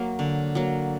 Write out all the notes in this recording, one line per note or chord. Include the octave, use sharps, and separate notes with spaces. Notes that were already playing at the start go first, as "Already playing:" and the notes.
Already playing: F#3 A#3
D3
F#3 A#3